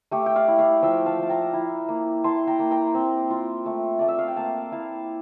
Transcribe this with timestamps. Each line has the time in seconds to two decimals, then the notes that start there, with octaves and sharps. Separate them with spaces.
0.11 A3 G4
0.26 G5
0.36 D5 F5
0.48 E4
0.58 D5 F5
0.82 F3 E5 G5
1.06 F5 A5
1.19 F3 A5
1.29 G5 A#5
1.53 E4
1.89 A#3
2.24 E4 A5 C6
2.47 G5 A#5
2.59 A#3
2.71 G5 A#5
2.94 C4
3.30 F4
3.66 A3
3.99 A3 D5
4.08 E5
4.19 F5
4.28 G5
4.36 A#3 F5 A5
4.72 E4 F5 A5